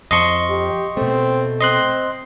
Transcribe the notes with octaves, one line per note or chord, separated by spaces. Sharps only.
F2 D#5 A5 C6 C#6
G4
B2 A3 C4
C4 D#5 C6 F#6